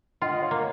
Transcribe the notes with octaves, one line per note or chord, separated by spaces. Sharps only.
F4 D#5 F#5
C#5 F5
A#3